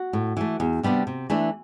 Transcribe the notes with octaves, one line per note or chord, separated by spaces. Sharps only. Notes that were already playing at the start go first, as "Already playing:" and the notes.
Already playing: F#4
A2
E3 A3
E2
C3 G3 B3 D4
C3
E3 A3 D4